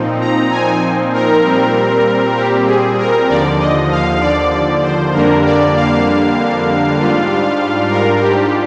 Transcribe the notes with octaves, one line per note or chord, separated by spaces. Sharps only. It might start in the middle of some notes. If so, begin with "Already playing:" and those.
Already playing: A#2 F3 C4 D#4
A#5
G#5
A#4
A#2 G3 C4
G4
G#4
A#4
D#2 D3 F3 D5
D#5
F5
D5
D5
C5
F2 D3 G3 A#3 D4 A#4
D5
F5
G#2 G3 D4 F4
A#4
G4